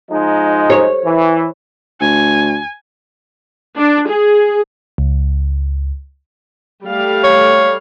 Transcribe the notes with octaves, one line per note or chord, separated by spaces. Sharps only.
F3 G#3 D#4
C#5
E3
D2 G#5
D4
G#4
C#2
G3 A3 F5
C#5